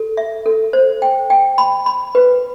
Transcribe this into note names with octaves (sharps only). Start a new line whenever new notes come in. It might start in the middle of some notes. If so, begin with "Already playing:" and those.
Already playing: A4
E5
A4
C5
G5
G5
B5
B5
B4